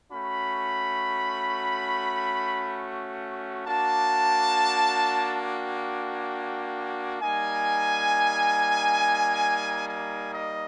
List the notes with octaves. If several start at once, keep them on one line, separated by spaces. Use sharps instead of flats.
A3 C#4 F#4 B5
A#3 D4 F#4 A5
G5
G3 A#3 D#4 G#5
G#5
D#5